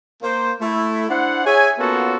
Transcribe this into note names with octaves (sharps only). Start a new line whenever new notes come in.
A#3 C5
A3 E4
D4 E4 C5 F#5
G#4 C#5 E5 G#5
A#3 B3 C#4 F4 F#4 A4